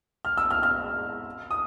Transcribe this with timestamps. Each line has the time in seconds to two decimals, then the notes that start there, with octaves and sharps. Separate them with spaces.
0.25 F6
0.37 E6
0.51 F6
0.63 F6
1.51 D#6